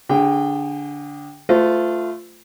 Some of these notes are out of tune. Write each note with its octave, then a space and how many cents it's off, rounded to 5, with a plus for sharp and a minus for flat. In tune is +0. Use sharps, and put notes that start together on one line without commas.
D3 -15 G#4 -25 G5 +0
A3 +0 F4 +0 C5 -35